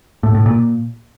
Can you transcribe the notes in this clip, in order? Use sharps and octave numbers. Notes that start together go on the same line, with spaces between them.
A2
A2
A#2